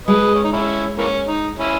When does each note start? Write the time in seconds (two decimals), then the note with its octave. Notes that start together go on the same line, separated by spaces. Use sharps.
0.07 G#3 B4 D#5
0.34 C#4
0.44 D#4
0.52 C#4 E4
0.98 E3 A#3 C#4
1.28 D#4
1.59 C#4 E4